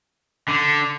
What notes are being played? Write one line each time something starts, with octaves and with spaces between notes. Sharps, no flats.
D3